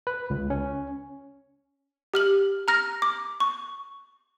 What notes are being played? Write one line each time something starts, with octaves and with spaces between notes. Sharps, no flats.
B4
C#2
C#4
G4 F6 F#7
A#5 F6 A#6
D6
C#6